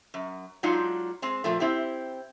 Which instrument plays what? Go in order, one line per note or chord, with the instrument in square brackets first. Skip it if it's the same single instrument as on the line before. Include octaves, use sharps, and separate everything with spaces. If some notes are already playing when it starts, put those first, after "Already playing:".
[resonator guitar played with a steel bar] F#2
F#3 G#3 D4 D#4 F4
G#3 C4
A#2 F3 A3
C4 E4 G4